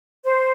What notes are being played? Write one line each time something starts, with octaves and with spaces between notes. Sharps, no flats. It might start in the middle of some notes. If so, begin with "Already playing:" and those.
C5